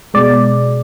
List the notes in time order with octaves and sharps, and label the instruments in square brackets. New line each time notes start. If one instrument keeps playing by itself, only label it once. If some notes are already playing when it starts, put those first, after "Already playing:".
[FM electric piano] B2 G#3 D5